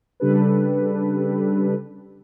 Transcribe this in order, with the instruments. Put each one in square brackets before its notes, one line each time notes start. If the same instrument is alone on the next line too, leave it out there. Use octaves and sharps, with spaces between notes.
[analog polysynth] C#3 G3 D4 G4 A4 B4